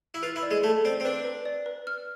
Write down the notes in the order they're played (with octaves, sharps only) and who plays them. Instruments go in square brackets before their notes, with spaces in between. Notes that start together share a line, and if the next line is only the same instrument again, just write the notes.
[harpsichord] E4
[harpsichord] F4 [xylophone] B4
[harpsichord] E4
[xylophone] D5
[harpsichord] G#3
[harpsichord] A3 [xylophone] A5
[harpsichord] C4 [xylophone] D5
[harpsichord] C4
[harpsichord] D4 [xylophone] B4
[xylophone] B4
D5
B4
F6